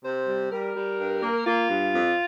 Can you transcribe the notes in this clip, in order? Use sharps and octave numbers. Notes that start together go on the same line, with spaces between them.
C3 C5
G3
G3 A#4
G3
G2
A#3
A#3 F4
G2
F2